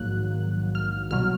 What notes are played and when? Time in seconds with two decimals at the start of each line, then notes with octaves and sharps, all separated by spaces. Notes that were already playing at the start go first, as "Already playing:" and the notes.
Already playing: A#1 G#2 D#3 F#3 A#3 F#6
0.75 F6
1.10 C2 B2 F#3 F6